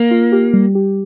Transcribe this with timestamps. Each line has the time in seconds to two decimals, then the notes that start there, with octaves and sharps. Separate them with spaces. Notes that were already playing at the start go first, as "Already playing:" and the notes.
Already playing: A#3
0.11 F4
0.32 G4
0.54 G3
0.75 G4